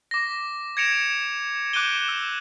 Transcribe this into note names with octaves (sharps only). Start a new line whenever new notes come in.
D6 A#6
G#6 A#6 C#7 D7 E7 F7
D6 F#6 G6 D7 D#7 G7
E6